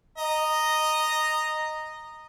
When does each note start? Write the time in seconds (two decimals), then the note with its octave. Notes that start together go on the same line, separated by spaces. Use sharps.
0.18 D#5 A#5